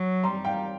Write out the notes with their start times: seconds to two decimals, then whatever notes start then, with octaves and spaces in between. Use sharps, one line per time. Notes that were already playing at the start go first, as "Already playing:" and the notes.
Already playing: F#3
0.24 G3 A#5 C6
0.45 F5 G5